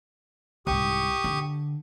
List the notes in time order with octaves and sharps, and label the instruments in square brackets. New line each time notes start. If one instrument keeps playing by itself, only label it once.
[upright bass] C2 G#2 [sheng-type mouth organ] G4 C#6 D#6
[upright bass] D3